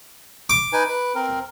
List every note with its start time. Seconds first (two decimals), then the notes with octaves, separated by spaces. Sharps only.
0.50 D6
0.73 D#4 B4 G#5
0.89 B4
1.15 C4 A#4